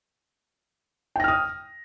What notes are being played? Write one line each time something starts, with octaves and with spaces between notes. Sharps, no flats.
G5 D#6 F6 A#6